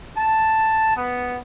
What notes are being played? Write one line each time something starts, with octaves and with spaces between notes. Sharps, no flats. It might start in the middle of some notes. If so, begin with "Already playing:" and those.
A5
B3